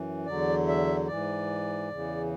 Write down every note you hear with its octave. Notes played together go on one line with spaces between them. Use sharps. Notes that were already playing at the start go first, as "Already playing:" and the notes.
Already playing: F#2 E3
E2 D3 F#3 D5
E5
G#2 E3 D5
E2 C#3 E3